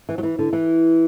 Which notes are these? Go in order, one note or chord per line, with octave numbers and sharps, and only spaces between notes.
E3
F#3
E3
D3
E3